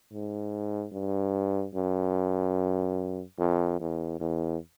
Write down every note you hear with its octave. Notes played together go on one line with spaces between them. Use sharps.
G#2
G2
F#2
F2
E2
E2